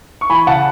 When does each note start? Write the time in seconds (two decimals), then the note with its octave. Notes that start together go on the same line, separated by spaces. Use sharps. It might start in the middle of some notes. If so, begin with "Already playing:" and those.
0.21 C#6
0.30 E3 G#5 B5
0.47 C#3 F#5 A5